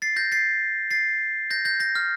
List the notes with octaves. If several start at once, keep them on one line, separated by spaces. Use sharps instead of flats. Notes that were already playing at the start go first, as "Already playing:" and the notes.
A6 C7
G6 A#6
A6 C7
A6 C7
G6 A#6
G6 A#6
G6 A#6
F6